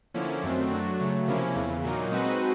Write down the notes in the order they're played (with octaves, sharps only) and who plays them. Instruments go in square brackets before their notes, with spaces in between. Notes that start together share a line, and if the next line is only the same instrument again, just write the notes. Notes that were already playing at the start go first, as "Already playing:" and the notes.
[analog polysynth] D3 F3 A#3 C#4 E4
F#2 D#3 F#3 A3 C4
F#3 A3 D4 F#4
C#3 F#3 A3
C3 F3 A#3 C#4 E4
E2 C#3 E3
A#2 F#3 A#3 D#4
G#3 C4 D#4 F#4 B4